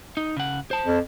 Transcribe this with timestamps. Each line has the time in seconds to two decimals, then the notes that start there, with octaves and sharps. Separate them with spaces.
0.17 D#4
0.36 C#3 F#5
0.71 C5 A5
0.85 F2